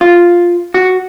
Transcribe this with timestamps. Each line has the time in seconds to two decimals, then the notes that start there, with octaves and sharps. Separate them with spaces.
0.01 F4
0.74 F#4